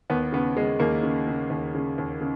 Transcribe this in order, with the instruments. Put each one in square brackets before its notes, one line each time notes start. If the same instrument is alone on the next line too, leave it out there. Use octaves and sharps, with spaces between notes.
[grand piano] D#2 B3
C#3 B3
C#3 G#3
D#2 A#3
C#3
C#3
D#2
C#3
D#2
C#3